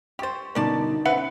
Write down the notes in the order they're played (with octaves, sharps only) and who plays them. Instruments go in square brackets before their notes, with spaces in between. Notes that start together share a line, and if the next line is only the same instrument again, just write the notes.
[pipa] G4 C5 [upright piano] C#6 A6
[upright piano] G1 B2 A#4 [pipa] C#4 D5 A5 [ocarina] D#4
[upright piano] C#4 C5 [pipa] B4 [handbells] E5 F#5